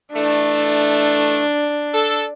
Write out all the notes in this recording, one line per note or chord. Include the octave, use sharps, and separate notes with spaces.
E3 A3 D4
A4